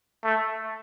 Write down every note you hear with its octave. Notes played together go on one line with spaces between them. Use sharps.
A3